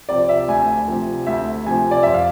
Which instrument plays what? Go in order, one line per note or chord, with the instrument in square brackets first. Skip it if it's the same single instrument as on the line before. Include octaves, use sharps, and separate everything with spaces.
[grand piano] C3 F3 D5
E5
D2 G#5
C3 F3
D2 E5
C3 F3 G#5
D5
F2 E5
F5